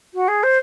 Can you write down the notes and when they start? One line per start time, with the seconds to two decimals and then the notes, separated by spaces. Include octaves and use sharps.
0.14 F#4
0.28 G#4
0.43 C5